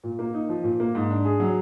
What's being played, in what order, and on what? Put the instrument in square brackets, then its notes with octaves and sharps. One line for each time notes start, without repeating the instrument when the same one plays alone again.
[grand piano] A#2
A#3
D#4
F3
A#2
A#3
G#2
D4
G#4
F#3